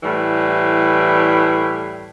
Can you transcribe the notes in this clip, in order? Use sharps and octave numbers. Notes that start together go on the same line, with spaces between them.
A2 E3 G3